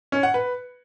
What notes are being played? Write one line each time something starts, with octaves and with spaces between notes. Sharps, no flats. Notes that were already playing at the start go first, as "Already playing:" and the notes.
C#4
F#5
B4